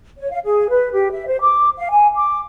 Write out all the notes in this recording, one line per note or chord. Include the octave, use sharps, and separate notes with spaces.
C#5
F5
G#4
B4
G4
E5
C5
D6
F5
G#5
D6